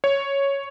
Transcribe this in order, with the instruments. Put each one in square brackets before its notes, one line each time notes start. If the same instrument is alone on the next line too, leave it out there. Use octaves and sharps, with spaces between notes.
[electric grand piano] C#5